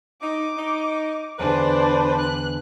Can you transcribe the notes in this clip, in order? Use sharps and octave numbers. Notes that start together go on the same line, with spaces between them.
D#4 D6
D#4
E2 D3 D4 B4 C5
F#6